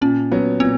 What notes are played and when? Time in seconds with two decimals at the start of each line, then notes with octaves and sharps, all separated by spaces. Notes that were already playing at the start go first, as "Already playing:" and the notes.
0.01 A#2 C#4
0.32 F#3 B3
0.60 A#2 C4